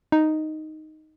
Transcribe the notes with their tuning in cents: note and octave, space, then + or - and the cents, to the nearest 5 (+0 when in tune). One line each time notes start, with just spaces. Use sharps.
D#4 +0